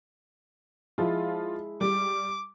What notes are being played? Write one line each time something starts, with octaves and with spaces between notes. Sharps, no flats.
F3 G#3 E4 F4
G3 D6